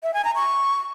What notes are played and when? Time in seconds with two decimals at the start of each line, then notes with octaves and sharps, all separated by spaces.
0.03 E5
0.14 G#5
0.25 A#5
0.35 C#6